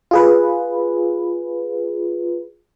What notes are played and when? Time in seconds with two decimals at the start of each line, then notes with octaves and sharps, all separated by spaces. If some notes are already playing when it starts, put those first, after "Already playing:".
0.11 F4 G#4 B4